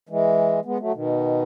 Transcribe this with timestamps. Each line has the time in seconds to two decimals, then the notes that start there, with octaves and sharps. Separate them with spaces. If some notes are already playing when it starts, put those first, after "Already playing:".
0.09 E3 G#3
0.65 G#3 B3
0.79 F#3 A3
0.94 B2 D#3